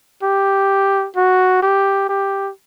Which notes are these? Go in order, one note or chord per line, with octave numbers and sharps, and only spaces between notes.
G4
F#4
G4
G4